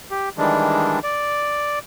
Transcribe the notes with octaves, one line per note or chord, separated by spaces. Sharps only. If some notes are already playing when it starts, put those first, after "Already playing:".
G4
D#3 E3 G3 G#3 D4
D5